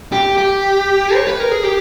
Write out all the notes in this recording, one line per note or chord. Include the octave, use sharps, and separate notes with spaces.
G4
G4
C#5
B4
A#4
G#4
G4